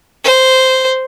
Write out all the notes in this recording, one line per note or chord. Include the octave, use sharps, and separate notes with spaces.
C5